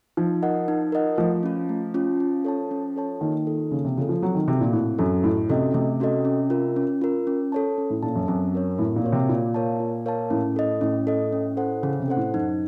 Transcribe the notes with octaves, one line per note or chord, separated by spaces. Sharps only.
F3 D#4
A#4 D#5 F#5
D#4
A#4 D#5 F#5
F3 A3
C#4 F4
A3
C#4 F4
C#4
A4 C#5 A5
C#4
A4 C#5 A5
D#3 A#3
F4 A4
C#3 A#3
C3
C#3 F4 A4
F3
F#3 C4
D#3
C3 F#4 A4
A#2
A2 C4
F#2 F#4 A4
A2 A3
C3 C#4 F#4 A4 D#5
C3 A3
C#4 F#4 A4 D#5
C#4
F4 A#4
C#4
F4 A#4
C#4
A4 C#5 A5
C#4
A2
A#2 A4 C#5 A5
F#2
F#2 C4
F#4 A#4 C#5
A2 C4
A#2
F#4 A#4 C#5
C3
A#2 F4
A#4 C#5 F5 A5
F4
A#4 C#5 F5 A5
A2 C#4
A4 D#5
A2 C#4
A4 D#5
C#4
A4 C5 F#5
C#3 C#4
C3
A4 C5 F#5
A2
F#2 D#4